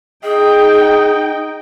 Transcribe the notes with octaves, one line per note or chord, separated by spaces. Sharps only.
D#4 G#4 D#5 G5